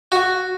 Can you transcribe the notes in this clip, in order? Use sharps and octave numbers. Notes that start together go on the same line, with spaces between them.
F#4